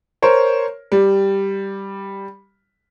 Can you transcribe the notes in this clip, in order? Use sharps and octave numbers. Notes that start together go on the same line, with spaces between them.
A#4 C5 C#5
G3